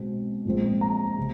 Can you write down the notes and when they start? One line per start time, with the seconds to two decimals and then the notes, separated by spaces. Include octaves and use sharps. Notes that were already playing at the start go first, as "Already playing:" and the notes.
Already playing: B2 G#3 C4
0.45 A#2 F3 G#3 C4
0.81 A#5
1.18 C3